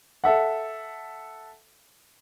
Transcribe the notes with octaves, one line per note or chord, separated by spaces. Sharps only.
A4 E5 F#5